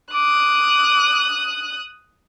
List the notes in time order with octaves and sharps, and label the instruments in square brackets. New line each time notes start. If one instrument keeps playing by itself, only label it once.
[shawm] D6 [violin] D#6 F#6